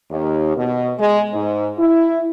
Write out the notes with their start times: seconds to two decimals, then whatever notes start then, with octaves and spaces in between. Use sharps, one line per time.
0.11 D#2
0.57 B2
0.99 G#3
1.33 G#2
1.79 E4